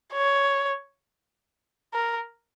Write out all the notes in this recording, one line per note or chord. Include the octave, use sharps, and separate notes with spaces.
C#5
A#4